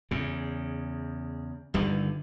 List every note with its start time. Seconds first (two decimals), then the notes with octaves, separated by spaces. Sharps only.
0.11 E2 C#3
1.74 G1 G2 D3 D#3